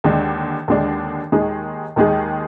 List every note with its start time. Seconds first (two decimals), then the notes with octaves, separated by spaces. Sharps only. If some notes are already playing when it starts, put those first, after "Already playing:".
0.04 D#2 D3 G#3 D4
0.68 D#2 D3 G#3 D4
1.32 D#2 D#3 G#3 D#4 G#4
1.96 D#2 D#3 G#3 D#4 G#4